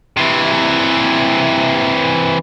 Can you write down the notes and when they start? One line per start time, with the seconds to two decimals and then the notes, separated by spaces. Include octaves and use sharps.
0.17 C3 E3